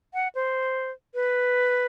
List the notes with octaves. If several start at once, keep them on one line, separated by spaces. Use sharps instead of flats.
F#5
C5
B4